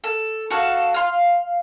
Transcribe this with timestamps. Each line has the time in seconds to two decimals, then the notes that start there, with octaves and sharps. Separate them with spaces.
0.04 A4
0.50 F#4 A4 F5
0.94 F5 C6